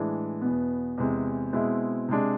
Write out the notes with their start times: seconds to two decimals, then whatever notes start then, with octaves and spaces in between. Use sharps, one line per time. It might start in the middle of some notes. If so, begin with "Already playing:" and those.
Already playing: A2 E3 G#3 D4
0.41 E2 B2 B3
0.98 E2 C3 G#3
1.53 B2 G#3 C4 E4
2.09 C3 G#3 D4